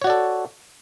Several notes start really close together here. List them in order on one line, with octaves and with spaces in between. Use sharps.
C#5 F#4 D5 A4